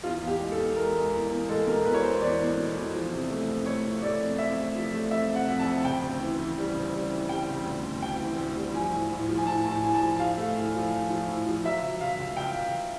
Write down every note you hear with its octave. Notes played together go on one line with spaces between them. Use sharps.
E2 F4
E2
G4
G#3
A4
E2
G#3 A#4
G#3
E2
E2
G#3 A4
B2 A#4
E2 B4
C#5
E2 C5
E2 D5
E2
B2
E2
F3
C3
A3
F2
A3 C#5
F2
A3 D5
F2
F2 E5
A3
F3
A3
F2 E5
C3 F#5
F2
A5
F2
C#3 G5
D2
E3
E3
G3
C#3
G3
E3
G3 G5
C#3
D2
D2
D2 G5
E3
D2
G3
F3 G#5
A2
A2
F3
G#5
A2 A5
A2
G#5
A2 G#5
A5
F3
F3 F5
A3
A2
F3
F3
F3
A2
F3
F#3 E5
C#2
C#2 F5
C#2
C#2 G5
C#2